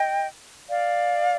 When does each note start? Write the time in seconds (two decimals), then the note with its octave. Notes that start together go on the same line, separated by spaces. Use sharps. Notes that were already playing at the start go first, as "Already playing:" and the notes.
Already playing: D#5 G5
0.70 D5 F5